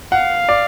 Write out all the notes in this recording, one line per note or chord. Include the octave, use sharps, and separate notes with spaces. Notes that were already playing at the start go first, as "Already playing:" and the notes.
F5 F#5
D5